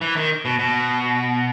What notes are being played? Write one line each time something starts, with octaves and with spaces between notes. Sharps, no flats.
E3
D#3
B2
B2